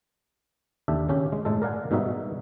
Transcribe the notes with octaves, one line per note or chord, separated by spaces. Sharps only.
D#2 D4 G4 A4 E5
C#3 C#4 G4
G#3
A2 G#3 A4
A#4 D5 F5 F#5 G#5
G#2 B2 G3 D#4 F#4 E5